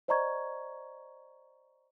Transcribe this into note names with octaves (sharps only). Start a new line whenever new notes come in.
C5 D5 D#5 A#5 C#6 G#6